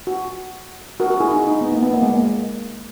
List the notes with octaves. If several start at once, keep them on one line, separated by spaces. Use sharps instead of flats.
F#4
F#4 A#4
F#4 A#4
E4 G#4
D#4
D#4
B3
A#3
B3
A#3
G#3
A#3